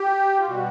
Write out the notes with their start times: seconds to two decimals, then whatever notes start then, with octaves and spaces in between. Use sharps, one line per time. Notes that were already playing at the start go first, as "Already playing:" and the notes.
Already playing: G4
0.40 F4
0.48 B2 G3 F#4